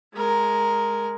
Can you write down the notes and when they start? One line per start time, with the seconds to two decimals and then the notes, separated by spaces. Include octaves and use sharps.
0.14 G#3 A#4